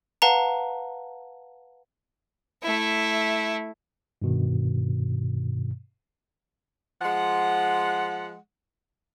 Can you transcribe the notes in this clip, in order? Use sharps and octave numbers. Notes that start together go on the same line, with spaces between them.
B4 F5 F#5 A5 A#5
A3 E4
G2 B2 D#3
F3 G#3 F#5